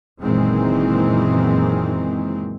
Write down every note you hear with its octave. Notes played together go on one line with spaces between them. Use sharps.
F#1 A#2 D#3 E3 G#3 C4